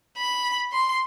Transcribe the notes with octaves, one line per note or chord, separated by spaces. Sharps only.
B5
C6